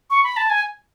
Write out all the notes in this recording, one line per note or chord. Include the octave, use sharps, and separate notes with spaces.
C#6
B5
A5
G#5